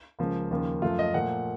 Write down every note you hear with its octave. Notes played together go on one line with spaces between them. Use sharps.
C#2 C#3 F3 A#3
D#2 C#3 F3 A#3
F#2 F3 A3 F4
D#5
A#2 F3 A3 F#5